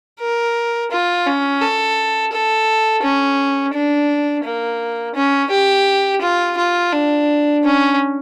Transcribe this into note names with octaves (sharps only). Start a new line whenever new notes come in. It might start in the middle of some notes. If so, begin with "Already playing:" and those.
A#4
F4
C#4
A4
A4
C#4
D4
A#3
C#4
G4
F4
F4
D4
C#4